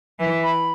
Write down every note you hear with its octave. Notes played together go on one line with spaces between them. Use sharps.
E3 E5
B5